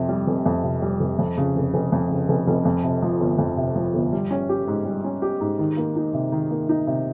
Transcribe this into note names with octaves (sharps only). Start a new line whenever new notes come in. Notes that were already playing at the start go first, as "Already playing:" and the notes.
Already playing: F2 C3
G3
F1
F2
C3
G3
F1
F2
C#3
F1
F1
F2
C#3
F1
F1
F2
C3
F3
G1
F2
C3
F3
G1
G3
C#4
G4
G#2
G3
C#4
G4
G#2
D#3
A#3
D#4
C3
D#3
A#3
D#4
C3